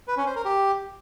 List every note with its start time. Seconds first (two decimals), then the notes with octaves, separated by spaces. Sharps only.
0.08 B4
0.17 C#4
0.26 C5
0.36 A#4
0.45 G4